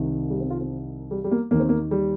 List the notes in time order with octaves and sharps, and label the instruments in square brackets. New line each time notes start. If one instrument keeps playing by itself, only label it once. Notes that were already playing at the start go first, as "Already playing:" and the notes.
Already playing: [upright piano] C2 C3 D#3
G3
C4
F4
C4
G3
G3
A#3
D#2 D#3 A#3
C4
A#3
G3